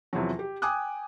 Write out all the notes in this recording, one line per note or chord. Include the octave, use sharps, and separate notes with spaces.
E2 C3 F3 F#3
G4
G5 G#5 D6 D#6 F#6